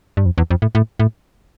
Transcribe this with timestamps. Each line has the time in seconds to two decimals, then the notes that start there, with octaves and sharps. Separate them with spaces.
0.17 G2
0.26 F2
0.38 E2
0.51 F2
0.62 A2
0.75 A2
1.00 A2